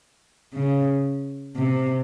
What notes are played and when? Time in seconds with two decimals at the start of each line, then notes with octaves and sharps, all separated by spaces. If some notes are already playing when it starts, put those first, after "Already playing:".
0.54 C#3
1.56 C3